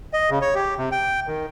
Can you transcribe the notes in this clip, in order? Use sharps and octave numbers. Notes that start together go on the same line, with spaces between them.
D#5
C#3
C#5
G4
C3
G5
D#3